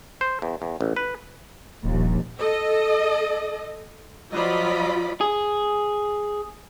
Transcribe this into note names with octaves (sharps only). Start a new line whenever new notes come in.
C5
E2
E2
A1
B4
D#1 A#1 D#2
A4 D#5
F3 F#3 F4 D5 D#5 B5
G#4